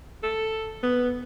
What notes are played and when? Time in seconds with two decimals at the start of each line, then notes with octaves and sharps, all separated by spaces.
0.23 A4
0.83 B3